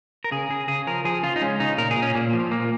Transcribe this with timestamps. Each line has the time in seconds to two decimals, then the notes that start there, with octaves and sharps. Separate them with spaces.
0.24 A#4
0.32 C#3 G#4
0.50 C#3 G#4
0.68 C#3 G#4
0.87 F3 A#4
1.05 F3 G#4
1.23 C#3 F4
1.36 D#4
1.42 G#3 C#4
1.60 C#3 D#4
1.78 A#2 A#4
1.91 G#4
1.96 A#2
2.02 C#4
2.15 A#2 A#3
2.33 F3
2.51 A#2 A#3